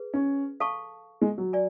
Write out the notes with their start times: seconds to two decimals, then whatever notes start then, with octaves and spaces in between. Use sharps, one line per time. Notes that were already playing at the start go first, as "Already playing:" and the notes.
Already playing: G#4 B4
0.14 C#4
0.60 A4 F5 A5 C#6
1.22 G#3
1.38 F#3
1.53 D5 G#5